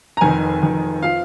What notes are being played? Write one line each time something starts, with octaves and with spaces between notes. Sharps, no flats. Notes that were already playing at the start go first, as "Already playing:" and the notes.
A#5
F1 F2 D#3 G#5
F1 F2 D#3
F3 F5